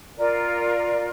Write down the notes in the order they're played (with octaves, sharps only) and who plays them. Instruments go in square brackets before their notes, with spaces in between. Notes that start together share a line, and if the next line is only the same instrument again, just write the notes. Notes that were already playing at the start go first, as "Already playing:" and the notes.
[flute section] F4 A#4 D5